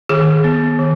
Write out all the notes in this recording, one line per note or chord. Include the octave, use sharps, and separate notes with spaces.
D#3 G#4
B3
D#3